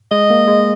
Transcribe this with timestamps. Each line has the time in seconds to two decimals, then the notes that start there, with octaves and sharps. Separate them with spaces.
0.11 G#3 D#5
0.30 A#3
0.47 G#3